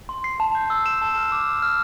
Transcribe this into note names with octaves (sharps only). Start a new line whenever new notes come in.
C6
C7
A5
G6
E6
E7
A5
F6
D6
E7
F6